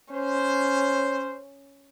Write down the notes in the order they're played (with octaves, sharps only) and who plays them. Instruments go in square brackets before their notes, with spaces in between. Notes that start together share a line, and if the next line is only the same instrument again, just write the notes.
[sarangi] C#4 [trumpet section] C5